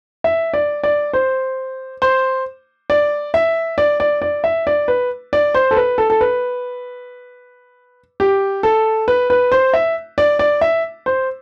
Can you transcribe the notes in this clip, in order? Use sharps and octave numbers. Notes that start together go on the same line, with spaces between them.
E5
D5
D5
C5
C5
D5
E5
D5
D5
D5
E5
D5
B4
D5
C5
A4
B4
A4
A4
B4
G4
A4
B4
B4
C5
E5
D5
D5
E5
C5